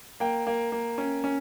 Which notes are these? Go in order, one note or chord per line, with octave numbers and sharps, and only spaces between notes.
A#3 G5
A#3
A#3
C#4
C#4